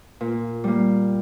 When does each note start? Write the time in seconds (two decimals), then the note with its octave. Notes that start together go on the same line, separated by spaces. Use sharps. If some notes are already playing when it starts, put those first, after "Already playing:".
0.21 A#2
0.64 G3 A#3